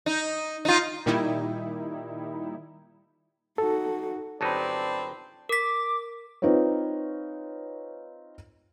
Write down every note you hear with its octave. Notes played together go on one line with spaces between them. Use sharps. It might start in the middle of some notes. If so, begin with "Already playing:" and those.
D#4
D#4 F4
A#2 D#3 G3 D#4 E4
D#4 F#4 A4
G1 F#3 C4 D#4 D5 A5 B5
A#4 D6 B6
C4 D#4 F4 B4 C#5